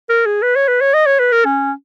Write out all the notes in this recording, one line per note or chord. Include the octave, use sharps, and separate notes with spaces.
A#4
G#4
B4
C#5
B4
C#5
D#5
C#5
B4
A#4
C#4